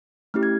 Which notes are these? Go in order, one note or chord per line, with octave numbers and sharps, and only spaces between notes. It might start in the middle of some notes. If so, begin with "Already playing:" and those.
A3 C#4 E4 G4 F6
G#6